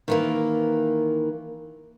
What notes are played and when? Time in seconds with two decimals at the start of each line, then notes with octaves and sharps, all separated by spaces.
0.08 D#3 E3 A#3